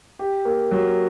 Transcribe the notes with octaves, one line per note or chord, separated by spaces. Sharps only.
G4
A#3
F#3